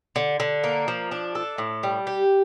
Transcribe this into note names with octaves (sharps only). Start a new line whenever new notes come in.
D3
D3
A#3
F3
D4
A4
A2
G3
G4